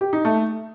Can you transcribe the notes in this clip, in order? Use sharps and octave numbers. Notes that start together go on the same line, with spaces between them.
G4
D#4
A3